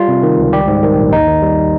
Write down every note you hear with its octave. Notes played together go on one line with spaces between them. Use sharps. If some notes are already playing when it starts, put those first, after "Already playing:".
Already playing: G3 F4
C3
D#3
C#2
G3 G4
G#2
D#3
A#1
D#2 D#4
D#3
G3